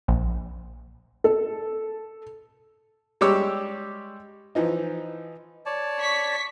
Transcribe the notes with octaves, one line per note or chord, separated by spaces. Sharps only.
A#1
A4
G3 G#3 G4 C#5 D6 E6
E3 F3 D#4
C#5 D5 A5
C#6 B6